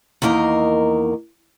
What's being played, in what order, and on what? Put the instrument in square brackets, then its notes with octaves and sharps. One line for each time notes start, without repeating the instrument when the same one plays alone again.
[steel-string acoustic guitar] E2 D#3 A#3 A#4 D#5